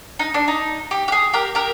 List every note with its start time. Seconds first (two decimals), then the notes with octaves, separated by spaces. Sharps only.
0.19 D#4
0.34 D4
0.48 D#4
0.91 G4
1.08 G4
1.12 G#4
1.33 G4 A#4
1.55 G4 A#4